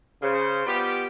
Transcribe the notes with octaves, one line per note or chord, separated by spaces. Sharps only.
C#3 C5
G3 B3 F4 G4